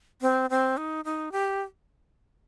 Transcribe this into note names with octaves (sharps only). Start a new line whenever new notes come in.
C4
C4
D#4
D#4
G4